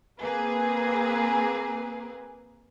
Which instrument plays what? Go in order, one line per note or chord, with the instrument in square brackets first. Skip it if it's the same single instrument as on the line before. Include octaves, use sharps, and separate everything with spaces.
[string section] A#3 C4 G#4 B4